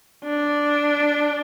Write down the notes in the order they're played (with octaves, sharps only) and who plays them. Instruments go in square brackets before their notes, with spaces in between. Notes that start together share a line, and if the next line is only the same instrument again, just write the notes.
[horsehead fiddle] D4